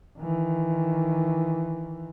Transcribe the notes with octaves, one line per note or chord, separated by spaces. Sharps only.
D#3 E3